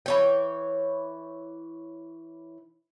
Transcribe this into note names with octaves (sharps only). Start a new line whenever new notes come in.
E3 C#5 G5